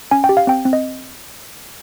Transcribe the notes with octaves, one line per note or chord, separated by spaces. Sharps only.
C#4 G#5
G5
G4
F5
C4 G5
C4
D#5